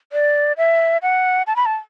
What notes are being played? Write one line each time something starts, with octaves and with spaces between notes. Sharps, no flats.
D5
E5
F#5
A5
B5
A5